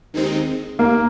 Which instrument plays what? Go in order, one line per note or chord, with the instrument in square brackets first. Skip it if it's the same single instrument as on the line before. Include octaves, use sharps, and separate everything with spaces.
[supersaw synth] D#2 D#3 G#3 C4 D#4
[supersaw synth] D#2 [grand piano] A#3